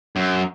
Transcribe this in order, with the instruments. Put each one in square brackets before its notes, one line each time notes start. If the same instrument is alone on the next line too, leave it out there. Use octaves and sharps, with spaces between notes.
[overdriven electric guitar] F#2